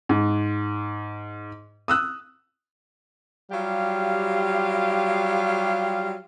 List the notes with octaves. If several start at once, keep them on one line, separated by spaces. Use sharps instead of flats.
G#2
D#6 E6 F#6
F#3 G3 F4 G4 F5